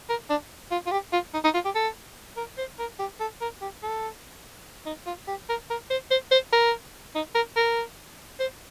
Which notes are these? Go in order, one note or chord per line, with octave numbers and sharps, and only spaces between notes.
A#4
D4
F4
F4
G4
F4
D#4
D#4
F4
G4
A4
A#4
C5
A#4
G4
A4
A#4
G4
A4
D#4
F4
G4
A#4
A#4
C5
C5
C5
A#4
D#4
A#4
A#4
C5